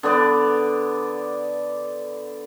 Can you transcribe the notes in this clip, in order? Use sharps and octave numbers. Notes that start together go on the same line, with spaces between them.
D3 B3 D5